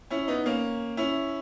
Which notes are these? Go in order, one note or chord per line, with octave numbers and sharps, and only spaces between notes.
C#4 E4
B3 D#4
A#3 C#4
C#4 E4